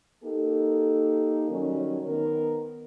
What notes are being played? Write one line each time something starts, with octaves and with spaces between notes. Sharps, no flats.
A#3 D#4 G4 A4
D#3 F#3 G3 C#4
D#3 B3 A#4